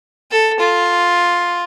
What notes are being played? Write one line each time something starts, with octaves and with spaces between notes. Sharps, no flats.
A4
F4